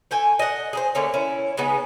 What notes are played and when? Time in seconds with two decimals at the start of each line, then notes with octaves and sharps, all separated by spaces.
0.11 A3 G5 G#5
0.39 D#5 F#5
0.73 G#4 A#4 C5
0.95 D3 A3 A#3 C#4
1.14 C#4 E4
1.57 C#3 G#3 B3 D#4